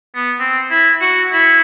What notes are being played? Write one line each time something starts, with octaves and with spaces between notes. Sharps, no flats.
B3
C4
E4
F#4
E4